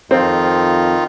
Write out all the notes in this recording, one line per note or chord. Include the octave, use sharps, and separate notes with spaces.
F2 D#3 C4 D#4 F4